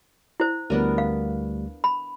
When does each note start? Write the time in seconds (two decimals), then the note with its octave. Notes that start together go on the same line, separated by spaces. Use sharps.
0.40 E4 C5
0.70 D2 G3 A3 B3 D4 A#4
0.98 F5
1.84 B5